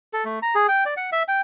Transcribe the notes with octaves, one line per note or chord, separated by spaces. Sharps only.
A4
A3
A#5
G#4
G5
D5
F#5
E5
G5